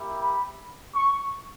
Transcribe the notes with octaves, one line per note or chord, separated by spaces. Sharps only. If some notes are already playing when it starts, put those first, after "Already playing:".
Already playing: A#3 E4 G4
B5
C#6